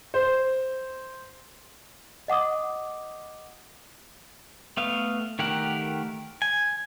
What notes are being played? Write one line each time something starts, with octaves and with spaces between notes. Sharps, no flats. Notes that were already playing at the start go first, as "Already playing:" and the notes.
C5
D#5 F#5 D6 D#6
A3 B3 F5
D#3 A3 G4 A#4 F#5
G#5